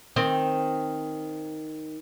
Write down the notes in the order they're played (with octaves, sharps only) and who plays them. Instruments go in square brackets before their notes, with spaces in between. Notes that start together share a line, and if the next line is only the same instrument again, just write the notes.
[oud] D#3 C4